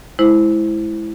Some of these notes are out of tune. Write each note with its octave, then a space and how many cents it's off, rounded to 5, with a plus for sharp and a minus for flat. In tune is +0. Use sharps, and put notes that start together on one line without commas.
G#3 +25 E4 +0 C5 +0